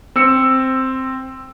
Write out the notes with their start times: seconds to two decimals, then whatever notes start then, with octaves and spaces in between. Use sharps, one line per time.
0.16 C4 E6 C#7